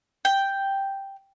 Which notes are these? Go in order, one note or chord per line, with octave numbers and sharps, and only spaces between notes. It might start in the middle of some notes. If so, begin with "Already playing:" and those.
G5